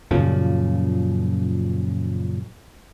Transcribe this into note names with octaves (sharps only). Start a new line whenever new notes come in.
F#2 A#2 C#3 F3